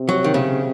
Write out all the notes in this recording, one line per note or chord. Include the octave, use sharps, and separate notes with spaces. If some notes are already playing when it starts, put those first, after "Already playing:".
Already playing: C3
F#3
D#3
C#3